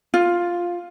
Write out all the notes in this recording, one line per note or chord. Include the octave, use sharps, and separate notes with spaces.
F4